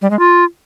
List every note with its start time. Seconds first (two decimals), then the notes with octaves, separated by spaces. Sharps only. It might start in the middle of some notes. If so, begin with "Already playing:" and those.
0.02 G3
0.10 G#3
0.19 F4